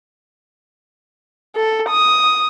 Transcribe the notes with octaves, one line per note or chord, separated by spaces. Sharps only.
A4
D#6